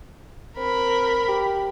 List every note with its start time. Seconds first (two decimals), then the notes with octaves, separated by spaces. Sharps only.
0.57 C4 A#4 B5
1.28 G4